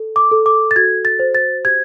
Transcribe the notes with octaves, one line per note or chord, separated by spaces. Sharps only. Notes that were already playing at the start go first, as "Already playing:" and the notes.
Already playing: A4
D6
A4
D6
A6
F#4 G#6
A6
C5
A6
G4 G#6